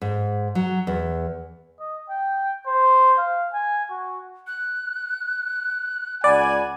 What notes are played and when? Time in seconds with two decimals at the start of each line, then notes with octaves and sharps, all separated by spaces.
0.01 G#2
0.55 F#3
0.87 E2
1.80 D#5
2.10 G5
2.67 C5
3.18 F5
3.53 G#5
3.91 F#4
4.47 F#6
6.24 C#2 D5 F#5 G#5 B5